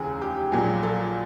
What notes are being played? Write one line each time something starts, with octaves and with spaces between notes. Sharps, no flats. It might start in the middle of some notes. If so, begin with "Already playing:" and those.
Already playing: F1 D#2 C#3 E3 G#4
G4
A#1 A#2 F#3 G#4
A4